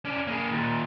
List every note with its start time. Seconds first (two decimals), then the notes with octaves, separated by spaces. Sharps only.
0.05 C#4 D5
0.27 A#3 G#4
0.51 D#2 A#2